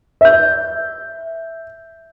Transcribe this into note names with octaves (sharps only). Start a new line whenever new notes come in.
E5 G6